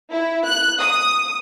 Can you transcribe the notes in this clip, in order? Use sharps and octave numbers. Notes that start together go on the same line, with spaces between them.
E4
F#6
D#6